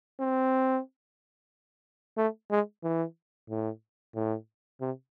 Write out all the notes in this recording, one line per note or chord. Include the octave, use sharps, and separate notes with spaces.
C4
A3
G#3
E3
A2
A2
C3